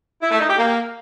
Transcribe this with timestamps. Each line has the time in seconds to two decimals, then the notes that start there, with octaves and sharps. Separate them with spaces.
0.22 E4
0.31 A3
0.40 D#4
0.49 G4
0.58 A#3